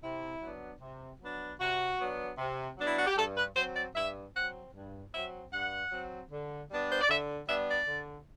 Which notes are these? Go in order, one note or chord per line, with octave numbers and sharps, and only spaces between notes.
C3 E4
F#3 B3 D4
C3
F#3 B3 D4
C3 F#4
F#3 B3 D4
C3
F#3 B3 D4
E4
F#4
G4
G2 A4
B4
F#3 C4 C5
D5
G2 E5
F#3 C4 F#5
G2
F#3 C4 E5
G2 F#5
F#3 C4
D3
G3 B3 D4
C5
D5
D3 E5
G3 B3 D4 E5
D5
D3